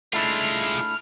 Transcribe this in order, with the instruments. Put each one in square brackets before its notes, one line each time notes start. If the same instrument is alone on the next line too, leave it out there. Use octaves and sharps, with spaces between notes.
[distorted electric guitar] G#3 F4 [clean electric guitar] A3 D4 E4 [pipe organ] F6